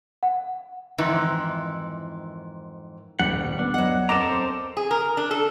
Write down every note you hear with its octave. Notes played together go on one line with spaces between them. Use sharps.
F#5
F2 G#2 D#3 E3
D#1 B1 G3 F#5
B3 D4
F#3 D#5 F#5
C4 A4 A#4 D#5 A#5 D6 E7
C5
G#4
A#4
D4
A4